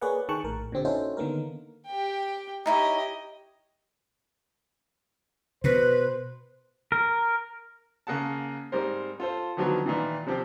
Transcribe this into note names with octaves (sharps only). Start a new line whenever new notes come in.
A#3 G#4 B4 C#5 D5 F#5
D#3 G#4 G5 A5 C#6 F#6
A#1 A2 A#4
A#2 D3 C4 G4
C#4 D#4 E4 F#4 A4 C5
D3 D#3 A#3 B3 A#4
G4 G5
D#4 E4 G4 C#5 D#5
B2 B4 C5
A#4
C#3 A#3 G#4 F#5 A5
G#2 G3 C4 A#4 C5
F4 A4 C5
D3 D#3 F3 F#3 B3 F#4
A#2 D#3 E3
C3 F3 C4 G4